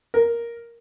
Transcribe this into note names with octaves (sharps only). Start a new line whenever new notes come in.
A#4